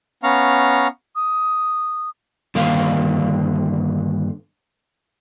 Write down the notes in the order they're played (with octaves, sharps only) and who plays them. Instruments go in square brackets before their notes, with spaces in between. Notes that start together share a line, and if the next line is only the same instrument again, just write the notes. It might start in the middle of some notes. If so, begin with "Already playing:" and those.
[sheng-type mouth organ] B3 C#4 F5 A#5 C#6
[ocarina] D#6
[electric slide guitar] G2 D3 D#3 A#3 F5